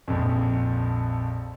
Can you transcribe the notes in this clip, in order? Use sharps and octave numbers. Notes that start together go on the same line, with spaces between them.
A#1 F2